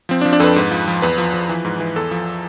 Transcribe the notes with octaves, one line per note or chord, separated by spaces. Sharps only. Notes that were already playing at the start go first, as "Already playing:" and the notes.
F3 C4
D4
F3
D4
F2 A4 B4
G#2
F3
F3
E2 B4
F3
F3
E3
G#2
E3
E2 A4
F3